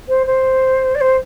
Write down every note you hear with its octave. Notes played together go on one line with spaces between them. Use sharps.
C5
C5
D5
C5